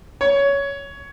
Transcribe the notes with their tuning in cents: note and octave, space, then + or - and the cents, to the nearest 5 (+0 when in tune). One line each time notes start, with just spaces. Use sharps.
C#5 +15